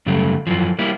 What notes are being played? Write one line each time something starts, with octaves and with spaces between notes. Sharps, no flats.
F#2 C#3 G3 A3
F#2 E3 F3
G3 A#3 E4